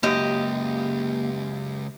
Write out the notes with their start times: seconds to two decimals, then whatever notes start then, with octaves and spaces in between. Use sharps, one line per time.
0.03 C#2 F#2 A#3 G4 D#5